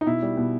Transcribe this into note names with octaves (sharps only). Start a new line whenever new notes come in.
D#4
B2 E4
G3
B2